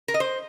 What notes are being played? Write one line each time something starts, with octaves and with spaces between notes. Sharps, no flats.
A#4
D#5
C5